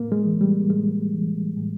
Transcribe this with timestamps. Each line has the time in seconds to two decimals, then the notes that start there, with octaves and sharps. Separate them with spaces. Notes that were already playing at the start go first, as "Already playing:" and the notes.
Already playing: A2 A#3
0.12 G#3
0.25 E3
0.41 G3
0.70 A2 G#3
1.13 E3
1.57 A2